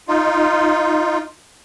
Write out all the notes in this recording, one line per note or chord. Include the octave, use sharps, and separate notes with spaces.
D#4 F4